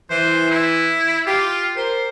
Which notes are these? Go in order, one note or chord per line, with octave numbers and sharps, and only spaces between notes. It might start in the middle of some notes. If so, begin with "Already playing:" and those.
E3 C5
E4
F4 G4
G4 A#4 C5